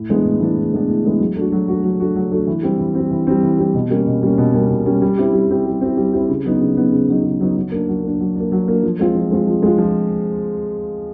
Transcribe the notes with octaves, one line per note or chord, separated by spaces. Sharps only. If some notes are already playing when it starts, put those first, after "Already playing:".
Already playing: A2
E3 G#3 B3 D4
A2
E3 G#3 B3 D4
A2
E3 G#3 B3 D4
A2
E3 G#3 B3 D4
F#3
A3 D4 F#4
F#3
A3 D4 F#4
F#3
A3 D4 F#4
F#3
A3 D4 F#4
E3
G3 C4
E3
G3 C4
E3
G3 C4
E3
G3 C4
B2
G3 A#3 C#4
B2
G3 A#3 C#4
B2
G3 A#3 C#4
B2
G3 A#3 C#4
G3
C4 E4 G4
G3
C4 E4 G4
G3
C4 E4 G4
G3
C4 E4 G4
C#3
F#3 B3 D#4
C#3
F#3 B3 D#4
C#3
F#3 B3 D#4
C#3
F#3 B3 D#4
F#3
A#3 D4
F#3
A#3 D4
F#3
A#3 D4
F#3
A#3 D4
F3
G#3 C4 F4
F3
G#3 C4 F4
F3
G#3 C4 F4
F3